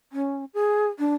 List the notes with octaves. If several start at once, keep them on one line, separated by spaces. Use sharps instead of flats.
C#4
G#4
D4